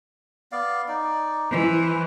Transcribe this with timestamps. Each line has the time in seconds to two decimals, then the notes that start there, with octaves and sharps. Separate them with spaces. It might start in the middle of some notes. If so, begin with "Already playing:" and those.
0.52 B3 D5 F5
0.88 D#4 D5
1.51 E3 B4 C5